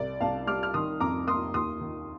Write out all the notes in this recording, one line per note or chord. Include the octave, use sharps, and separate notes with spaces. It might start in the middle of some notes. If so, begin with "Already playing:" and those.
Already playing: C2 D5
C2 F5 A5
G3 D6 F6
F6
D#3 C6 D#6
F2 A#5 D6
A#3 C6 D#6
D#2 C6 D#6
D#3